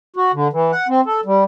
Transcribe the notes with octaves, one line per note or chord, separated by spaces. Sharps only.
F#4
D3
E3
F#5
C4
A4
G3